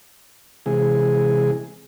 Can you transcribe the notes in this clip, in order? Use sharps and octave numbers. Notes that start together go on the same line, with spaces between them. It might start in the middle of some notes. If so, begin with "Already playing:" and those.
C3 E3 G#3 G#4